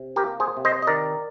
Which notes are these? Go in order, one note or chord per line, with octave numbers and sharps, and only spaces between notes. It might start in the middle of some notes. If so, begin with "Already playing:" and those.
Already playing: C3
G4 A#4
A#3
G#4 C5
C3
C5 D#5
D#5
D#3 A#4 D5